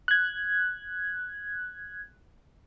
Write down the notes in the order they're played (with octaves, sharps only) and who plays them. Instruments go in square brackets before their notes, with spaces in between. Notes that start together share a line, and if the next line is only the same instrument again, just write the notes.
[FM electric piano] F#6 G#6